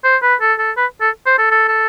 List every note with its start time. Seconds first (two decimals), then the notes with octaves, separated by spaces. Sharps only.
0.04 C5
0.22 B4
0.41 A4
0.59 A4
0.77 B4
1.01 A4
1.26 C5
1.39 A4
1.51 A4
1.68 A4